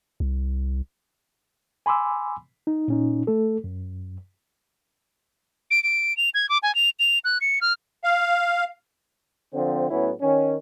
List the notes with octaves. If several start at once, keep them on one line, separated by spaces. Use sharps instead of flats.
C2
G#5 B5 C6 D6 E6
D#4
A#2 C#4 D#4
A3 A4
F#2
D7
D7
F7
G#6
D6
G#5
F7
F7
F#6
C#7
F6
F5
D3 F3 C4
A2 F#3 B3 C#4 E4
D#3 C#4